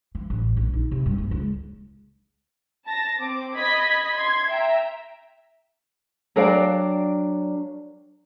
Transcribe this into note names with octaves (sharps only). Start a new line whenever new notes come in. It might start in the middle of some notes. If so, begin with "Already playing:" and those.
E3
A1
A#1
D#4
C3
G2
A#3
C#2
A5 A6 A#6
C4 D6
D#5 B5 G#6 B6
C6 G#6
E5 G5 A#5
F#3 D4 A#4 D5 F5 G5